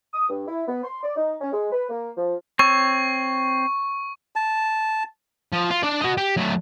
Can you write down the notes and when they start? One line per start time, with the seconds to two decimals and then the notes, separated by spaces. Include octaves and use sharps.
0.14 D#6
0.29 G2
0.48 E4
0.68 B3
0.84 C6
1.04 D5
1.16 D#4
1.41 C#4
1.53 G#3
1.72 B4
1.89 A#3
2.17 F3
2.59 C4 C#5 C#6 E6
4.36 A5
5.53 F3
5.71 F4
5.83 D4 D5
6.02 F#4 D#5
6.17 G4
6.37 F#3 A3